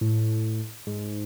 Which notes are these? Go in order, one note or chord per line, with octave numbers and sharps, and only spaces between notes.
A2
G#2